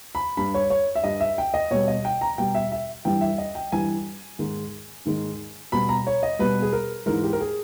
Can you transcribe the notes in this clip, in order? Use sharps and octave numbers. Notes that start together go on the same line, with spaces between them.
B5
G2 G3 B5
C#5
C#5
E5
G2 G3 D#5
E5
G5
D#5
B2 G3 C#5
D#5
G5
A#5
B2 G3 G5
E5
E5
G2 E3 G3 G5
E5
D#5
G5
G2 E3 G3 G#5
G#2 D#3 G#3
G#2 D#3 G#3
B2 G3 B5
A#5
C#5
D#5
B2 G3 B4
G#4
A#4
G#2 E3 G#3 A#4
G4
A#4
G#4